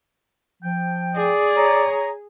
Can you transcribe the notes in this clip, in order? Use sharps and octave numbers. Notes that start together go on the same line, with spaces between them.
F3 G5
G#4 D5
C#5 A#5